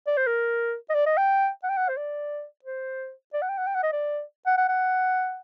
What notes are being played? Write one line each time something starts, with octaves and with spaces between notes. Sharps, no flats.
D5
C5
A#4
D#5
D5
D#5
G5
F#5
G5
F#5
C5
D5
C5
D5
F#5
G5
F#5
G5
F#5
D#5
D5
F#5
F#5
F#5